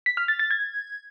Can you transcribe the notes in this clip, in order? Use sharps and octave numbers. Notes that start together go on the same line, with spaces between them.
B6
F6
A6
A6
G#6